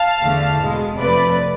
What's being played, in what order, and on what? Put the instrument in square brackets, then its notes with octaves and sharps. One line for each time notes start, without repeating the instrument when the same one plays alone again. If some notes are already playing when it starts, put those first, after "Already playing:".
Already playing: [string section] F5 A5
E2 D3 A3
B2 G#3
F2 C3 F3 A3 B4 D5